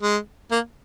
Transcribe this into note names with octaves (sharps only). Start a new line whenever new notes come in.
G#3
A#3